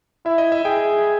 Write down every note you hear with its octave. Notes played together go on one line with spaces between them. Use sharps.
E4 E5
D#5
E5
G#4 G5